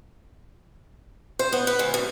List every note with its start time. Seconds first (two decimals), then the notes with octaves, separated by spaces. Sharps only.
1.39 C5
1.53 B3
1.67 B4
1.79 D2
1.94 F#2